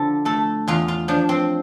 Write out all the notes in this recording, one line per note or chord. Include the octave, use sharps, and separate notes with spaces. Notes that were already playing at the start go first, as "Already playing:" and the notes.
Already playing: D3 F3 A4
A3 A4
E2 F4
F4
F3 D4
C4